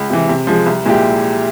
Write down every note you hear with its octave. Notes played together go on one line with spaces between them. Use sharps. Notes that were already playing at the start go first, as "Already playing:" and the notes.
Already playing: C#2
C3 E3
C3
F3 G#3
C2
A#2 G#3 E4 G4